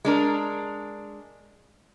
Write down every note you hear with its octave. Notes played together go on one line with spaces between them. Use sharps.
G#3 D4 A#4